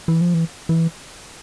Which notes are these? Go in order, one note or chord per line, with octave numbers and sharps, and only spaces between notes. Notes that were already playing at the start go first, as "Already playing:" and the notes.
E3
F3
E3
E3